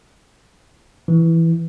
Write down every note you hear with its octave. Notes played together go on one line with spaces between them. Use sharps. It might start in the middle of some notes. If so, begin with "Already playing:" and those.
E3